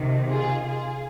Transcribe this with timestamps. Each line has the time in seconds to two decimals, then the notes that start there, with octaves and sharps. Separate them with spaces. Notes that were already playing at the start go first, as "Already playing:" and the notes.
Already playing: C3 D#3
0.28 F4 G#4
0.65 F4 G#4